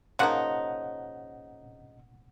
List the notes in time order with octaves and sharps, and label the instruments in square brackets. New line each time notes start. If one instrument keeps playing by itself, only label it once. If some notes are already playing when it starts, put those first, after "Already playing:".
[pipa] C#3 F3 A#3 D#4 [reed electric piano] F#5